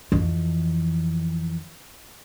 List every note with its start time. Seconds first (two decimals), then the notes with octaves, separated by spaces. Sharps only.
0.12 F2 E3